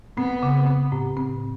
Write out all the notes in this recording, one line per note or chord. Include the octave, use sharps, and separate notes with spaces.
B3 C4
C#3
C4
A2
C4